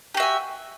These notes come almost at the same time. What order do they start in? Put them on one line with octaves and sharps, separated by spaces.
G4 F#4 E5 G#5